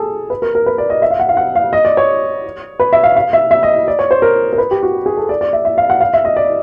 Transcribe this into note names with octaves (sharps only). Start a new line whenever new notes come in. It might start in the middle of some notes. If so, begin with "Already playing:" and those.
Already playing: G#4 A4
B4
A#4
A#4
B4
D5
D#5
E5
F5
F#5
F5
F#5
F5
D#5
D5
C#5
B4
E5
F5
F5
E5
E5
D#5
D5
C#5
C5
A#4
A#4
B4
G4
F#4
G#4
A4
D5
D5
E5
E5
F5
F#5
F5
E5
D#5
D5